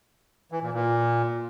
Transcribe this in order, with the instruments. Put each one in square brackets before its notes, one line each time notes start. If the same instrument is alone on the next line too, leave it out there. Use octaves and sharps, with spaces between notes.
[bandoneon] E3
A#2
A#2